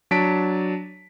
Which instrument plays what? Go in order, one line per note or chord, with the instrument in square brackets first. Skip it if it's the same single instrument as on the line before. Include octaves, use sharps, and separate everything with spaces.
[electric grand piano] F#3 D4 A5 B6 D7